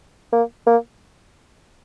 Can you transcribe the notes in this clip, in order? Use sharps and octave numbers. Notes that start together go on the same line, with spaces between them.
A#3
A#3